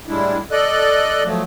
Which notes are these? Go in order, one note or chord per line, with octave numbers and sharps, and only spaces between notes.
A2 G3 G#3 D4 E4
A4 D5 D#5 F#6
F3 F#3 A3